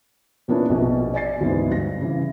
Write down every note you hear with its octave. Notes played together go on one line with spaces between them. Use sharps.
A#2 A#3 B3 C#4 D4 E4
A#1 B2
D5 G#5 A6 C7
D2 G#2 E3 B3
G2 A#6
C#3 E3